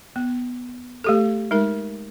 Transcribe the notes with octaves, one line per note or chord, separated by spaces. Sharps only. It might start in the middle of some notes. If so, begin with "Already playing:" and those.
B3
A3 G4 A4
G#3 D#4 A#4